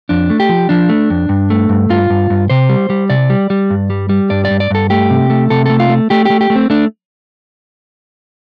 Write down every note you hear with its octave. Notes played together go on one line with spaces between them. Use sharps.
F2 D4
A3
G4
F3
F3 D4
A3
F2
G2
A3
G2
G2 F4
G2
G2
C3 C5
G3
G3
C3 D5
G3
G3
G2
G3
G3
G2 D5
D5
G2
D5
G2 A4
A3 G4
C3
A3
C3 A4
A3 A4
F4
A3
A3 G4
A3 G4
G4
A3
C4
A3 D4